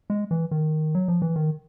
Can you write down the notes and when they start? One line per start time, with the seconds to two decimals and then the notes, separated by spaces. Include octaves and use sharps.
0.10 G#3
0.31 E3
0.51 D#3
0.95 F#3
1.08 F3
1.22 E3
1.36 D#3